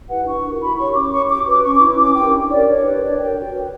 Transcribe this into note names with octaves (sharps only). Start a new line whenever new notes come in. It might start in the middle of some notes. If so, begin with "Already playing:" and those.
E4 G4 B4 F#5
D4 C#6
F#4 A#4
E4 B5
G4 C#5 C#6
C#4 D6
G4 C#5 C#6
F#4 D6
B4 D6
C#4 C#6
D6
E4 B4
C#4 D6
E4 G4 A#4 G5
D4
G4 A#4 C#5 D5
D4 C#5
G4 B4
D4 D5
A#4 C#5 G5
F#4 G5
B4